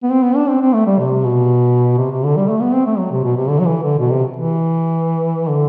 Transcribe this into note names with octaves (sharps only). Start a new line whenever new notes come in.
B3
C4
B3
D4
C4
C4
A3
G3
C3
B2
C3
C3
D3
G3
A3
B3
C4
A3
F#3
C3
B2
C3
D3
F#3
E3
D3
B2
C3
E3
D3